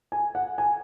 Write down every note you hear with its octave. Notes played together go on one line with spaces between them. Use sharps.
G#5
F#5
G#5